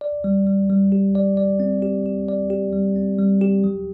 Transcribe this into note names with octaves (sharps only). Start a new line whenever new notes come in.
D5
G3
G3
G3
G4
D5
D5
C4
G4
G4
D5
G4
G3
C4
G3
G4
F#3